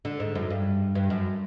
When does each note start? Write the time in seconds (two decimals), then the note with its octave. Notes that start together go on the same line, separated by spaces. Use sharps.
0.05 D3
0.20 G#2
0.35 F#2
0.50 G2
0.95 G2
1.10 F#2